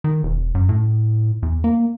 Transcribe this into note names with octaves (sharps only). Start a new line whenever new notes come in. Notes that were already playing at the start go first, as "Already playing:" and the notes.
D#3
E1
F#2
A2
E2
A#3